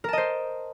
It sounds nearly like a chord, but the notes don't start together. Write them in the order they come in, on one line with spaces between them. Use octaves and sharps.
A#4 A5 D#5 C5